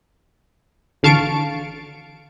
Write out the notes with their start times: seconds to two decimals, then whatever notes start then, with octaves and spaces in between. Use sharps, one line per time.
1.03 A1 D3 F5 A5 C#6 D7